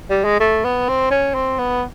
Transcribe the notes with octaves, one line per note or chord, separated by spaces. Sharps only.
G3
G#3
A3
B3
C4
C#4
C4
B3